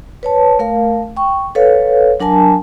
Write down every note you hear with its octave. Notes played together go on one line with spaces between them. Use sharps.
B4 C#5 A5
A3 A#4 F5
G5 C#6
A4 B4 C#5 F5
F#3 D4 A#4 G#5 A5